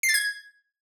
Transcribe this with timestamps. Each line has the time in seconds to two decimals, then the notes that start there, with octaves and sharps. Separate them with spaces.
0.03 C7
0.09 A6
0.14 G#6